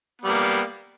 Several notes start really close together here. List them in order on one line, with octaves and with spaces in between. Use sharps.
B3 G3 A#3